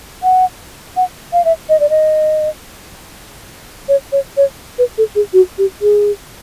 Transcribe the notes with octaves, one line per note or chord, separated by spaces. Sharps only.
F#5
F#5
F5
E5
D#5
D5
D#5
C#5
C#5
C#5
B4
A4
G#4
F#4
G4
G#4